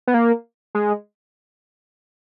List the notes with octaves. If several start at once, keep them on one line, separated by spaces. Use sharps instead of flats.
B3
A#3
G#3